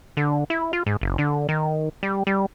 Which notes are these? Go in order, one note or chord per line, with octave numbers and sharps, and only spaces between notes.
D3
E4
F4
G#2
F#1
D3
D#3
G3
G3